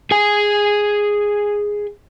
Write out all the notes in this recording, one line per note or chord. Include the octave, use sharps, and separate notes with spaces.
G#4 G#5